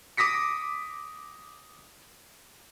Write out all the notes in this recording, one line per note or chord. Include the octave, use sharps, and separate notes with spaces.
D6 D#6 A#6 B6 C#7